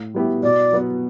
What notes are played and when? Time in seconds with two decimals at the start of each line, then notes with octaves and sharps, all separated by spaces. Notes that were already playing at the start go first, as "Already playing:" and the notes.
Already playing: A2
0.14 G3 B3 E4 G4
0.43 B2 D5
0.72 F#3 B3